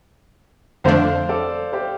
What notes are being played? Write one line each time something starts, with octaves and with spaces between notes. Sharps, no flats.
F2 D3 A3 D4 C5 F5
A4 D5
G4 C5